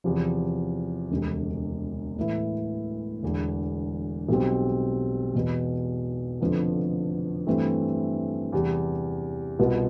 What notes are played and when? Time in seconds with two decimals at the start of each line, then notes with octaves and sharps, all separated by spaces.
0.04 E2 C3 F3
1.10 E1 D2 C3
2.16 A2 E3 B3 E4
3.22 E1 E2 D3
4.29 B1 B2 G3 C4
5.34 E2 B2 B3
6.40 F1 F2 D3 F3 B3
7.47 G2 E3 A3 C4
8.53 E2 C3 G3
9.59 C2 B2 B3 F4